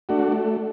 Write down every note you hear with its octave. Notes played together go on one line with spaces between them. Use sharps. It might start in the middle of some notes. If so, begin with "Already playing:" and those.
A3 D4 F#4
A3